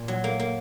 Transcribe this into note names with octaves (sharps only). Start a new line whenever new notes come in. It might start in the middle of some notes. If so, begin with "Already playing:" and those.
Already playing: A#2
F#3
A#3
A#3